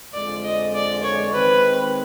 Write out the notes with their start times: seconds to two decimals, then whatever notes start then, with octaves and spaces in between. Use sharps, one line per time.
0.14 F2 D3 F3 G#3 D5
0.44 D#5
0.74 D5
1.03 C#5
1.33 D#3 G#3 C4 B4